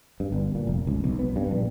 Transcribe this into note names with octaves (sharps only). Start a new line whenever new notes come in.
G2
G1
A#2
F1
C#2
B1
B3
G2
A#1